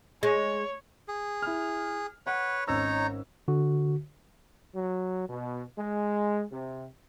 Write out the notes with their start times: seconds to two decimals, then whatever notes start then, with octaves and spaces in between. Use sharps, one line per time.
0.23 G#3 C#5
1.08 G#4
1.42 E4 F6
2.27 B4 C#5 F#5
2.68 G#1 C#4 D#4 C#5 A#5 E6
3.48 D3 F#4
4.75 F#3
5.29 B2
5.78 G#3
6.52 C3